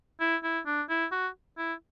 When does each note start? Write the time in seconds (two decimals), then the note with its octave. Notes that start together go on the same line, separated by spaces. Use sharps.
0.20 E4
0.43 E4
0.66 D4
0.89 E4
1.12 F#4
1.58 E4